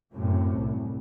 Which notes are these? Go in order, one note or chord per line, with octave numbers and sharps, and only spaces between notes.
F#2 A2 C3
C2